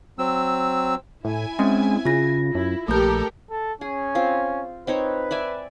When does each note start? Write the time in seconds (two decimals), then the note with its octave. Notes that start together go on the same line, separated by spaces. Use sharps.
0.19 F#3 C4 E6
1.25 A2 E4 G#5
1.59 G#3 C4 C#4
2.05 C#3 F4 A#6
2.55 F#2 E4
2.88 A#1 A3 G4 A4 A#4 G6
3.50 A4
3.81 C#4 G#4
4.15 C4 F4
4.87 C4 D#4 B4 C#5
5.31 D5 E5 G#5